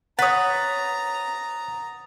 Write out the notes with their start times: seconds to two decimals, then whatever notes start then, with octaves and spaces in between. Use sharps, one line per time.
0.19 B4 C#5 F#5 A#5 D#6 A6